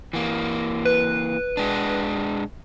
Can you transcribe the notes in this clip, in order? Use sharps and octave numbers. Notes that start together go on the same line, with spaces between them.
E3 A#3
B4
G#3 D4